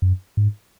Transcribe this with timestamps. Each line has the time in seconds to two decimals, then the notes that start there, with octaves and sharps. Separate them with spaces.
0.02 F#2
0.37 G#2